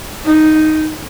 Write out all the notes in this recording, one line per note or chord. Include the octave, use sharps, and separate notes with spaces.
D#4